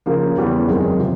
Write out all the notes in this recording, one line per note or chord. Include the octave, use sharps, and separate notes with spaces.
C#3 F3 A#3
E2 C#3 E3 G3 B3
F#2 D#3 G#3 C4
C3 F3